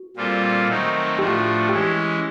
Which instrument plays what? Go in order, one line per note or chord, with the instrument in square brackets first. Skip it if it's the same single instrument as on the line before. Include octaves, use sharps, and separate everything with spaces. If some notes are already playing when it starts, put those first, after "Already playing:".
Already playing: [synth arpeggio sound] F#4
[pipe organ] A#2 G3 C4 F4 A4
D#3 F#3 A3 C4 D#4
[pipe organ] A2 F3 A3 D4 F#4 [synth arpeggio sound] G4
[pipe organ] E3 G#3 C#4 E4 [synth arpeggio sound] G4